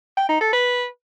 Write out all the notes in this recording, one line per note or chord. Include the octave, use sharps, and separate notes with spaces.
G5
D#4
A4
B4